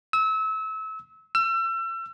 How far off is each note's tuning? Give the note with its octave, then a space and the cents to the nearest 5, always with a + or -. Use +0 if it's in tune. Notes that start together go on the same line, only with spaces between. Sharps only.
E6 -30
E6 +35